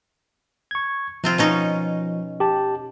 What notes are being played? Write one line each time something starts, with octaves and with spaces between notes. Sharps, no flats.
C#6 G#6
C3 F3 C4 F4
B2 C#4 D#4
G4 A5